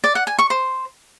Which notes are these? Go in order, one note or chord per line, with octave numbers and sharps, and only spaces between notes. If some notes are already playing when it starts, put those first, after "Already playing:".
D5
F#5
G#5
C#6
C5